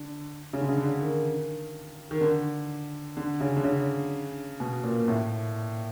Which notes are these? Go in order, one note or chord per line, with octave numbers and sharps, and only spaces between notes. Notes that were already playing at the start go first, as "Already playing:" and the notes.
Already playing: D3
C#3
D3
C#3
D3
D#3
D#3
D3
D3
C#3
D3
C#3
B2
A#2
A2